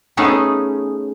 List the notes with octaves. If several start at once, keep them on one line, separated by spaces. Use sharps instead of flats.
A3 B3 C#4 D#4 G#4